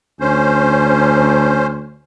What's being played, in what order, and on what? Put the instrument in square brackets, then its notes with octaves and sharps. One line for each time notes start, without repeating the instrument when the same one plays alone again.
[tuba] D2 [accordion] C#4 C5